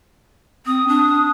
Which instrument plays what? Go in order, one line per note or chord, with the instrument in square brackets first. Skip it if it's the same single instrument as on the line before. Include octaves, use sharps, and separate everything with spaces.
[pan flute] C4 [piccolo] D#6
[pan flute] D4